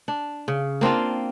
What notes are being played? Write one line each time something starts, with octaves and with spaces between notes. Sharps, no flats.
D4
C#3
A#3 C4 D4 F4